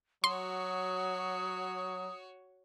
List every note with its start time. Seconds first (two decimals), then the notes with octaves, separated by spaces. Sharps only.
0.24 F#3 F#4 C#5 C6 D#6